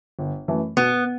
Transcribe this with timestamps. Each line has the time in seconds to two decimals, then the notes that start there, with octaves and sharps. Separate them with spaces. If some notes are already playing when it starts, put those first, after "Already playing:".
0.19 G1
0.48 F#2 E3 A3
0.77 B2 B3